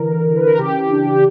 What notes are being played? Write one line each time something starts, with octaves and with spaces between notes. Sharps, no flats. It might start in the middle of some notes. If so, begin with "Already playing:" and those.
Already playing: D3 E3 A#4
E3
B4
A#4
C#3 G4
D4
G4